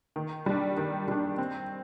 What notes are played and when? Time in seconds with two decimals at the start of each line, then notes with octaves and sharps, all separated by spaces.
0.16 D#3
0.46 G3 D4
0.77 D#3
1.08 G3 D4
1.38 C4